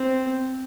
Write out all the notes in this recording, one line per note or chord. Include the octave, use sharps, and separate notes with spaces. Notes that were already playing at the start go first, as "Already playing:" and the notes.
Already playing: C4